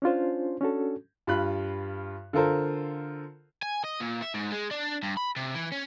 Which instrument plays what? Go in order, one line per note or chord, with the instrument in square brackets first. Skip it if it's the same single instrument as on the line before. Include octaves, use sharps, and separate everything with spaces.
[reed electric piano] C#4 D4 F4 C5
C#4 D4 F#4 A4
[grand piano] G2 F4 B5 F#6
D3 F4 A4 A#4 C5
[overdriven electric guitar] G#5
D#5
A#2
E5
G#2
G#3
D4
G2
B5
C3
E3
C#4